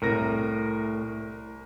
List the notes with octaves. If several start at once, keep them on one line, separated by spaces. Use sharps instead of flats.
C2 A2 A#4 A#6